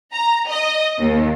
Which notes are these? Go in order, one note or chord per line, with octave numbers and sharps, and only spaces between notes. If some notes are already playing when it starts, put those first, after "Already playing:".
A#5
D#5
D#2